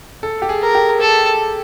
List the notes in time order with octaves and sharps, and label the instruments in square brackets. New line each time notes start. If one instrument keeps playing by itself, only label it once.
[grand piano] A4
G4
G#4
[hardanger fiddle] A#4
[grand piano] G4
[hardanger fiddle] A4